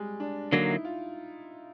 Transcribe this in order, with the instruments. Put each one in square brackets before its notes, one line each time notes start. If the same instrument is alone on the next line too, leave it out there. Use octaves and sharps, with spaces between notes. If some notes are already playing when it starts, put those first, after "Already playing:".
Already playing: [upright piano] G3 G#3
D4
[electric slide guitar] D3 F#3 A#3 [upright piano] D#4
[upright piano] E4
F4